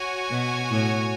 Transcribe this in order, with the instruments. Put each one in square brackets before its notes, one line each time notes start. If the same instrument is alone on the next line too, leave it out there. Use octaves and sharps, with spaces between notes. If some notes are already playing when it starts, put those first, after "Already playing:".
Already playing: [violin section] F#4 C#5 G#5
[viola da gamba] B2
A2